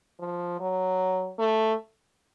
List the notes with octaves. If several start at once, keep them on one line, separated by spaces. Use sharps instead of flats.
F3
F#3
A3